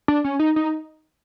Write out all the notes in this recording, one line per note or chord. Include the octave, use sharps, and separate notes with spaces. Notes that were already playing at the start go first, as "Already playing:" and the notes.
D4
C#4
D#4
D#4